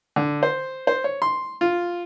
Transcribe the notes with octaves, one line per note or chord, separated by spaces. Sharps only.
D3
C5
C5
C#5
C6
F4